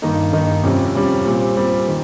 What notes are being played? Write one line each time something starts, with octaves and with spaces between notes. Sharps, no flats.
G2 D#3 A#3 D#4
G2 D#3 A#3 D#4
F2 C3 G3 C#4
F2 C3 G3 C#4
A#2 G3 C4
A#2 G3 C4
D#3